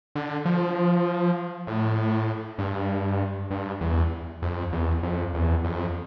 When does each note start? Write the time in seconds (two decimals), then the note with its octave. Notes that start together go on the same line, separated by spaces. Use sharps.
0.15 D3
0.45 F3
1.67 A2
2.58 G2
3.50 G2
3.81 E2
4.42 F2
4.73 E2
5.03 F2
5.34 E2
5.64 F2